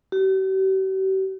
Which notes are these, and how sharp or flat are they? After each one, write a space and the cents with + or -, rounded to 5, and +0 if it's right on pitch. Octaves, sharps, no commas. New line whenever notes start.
G4 -45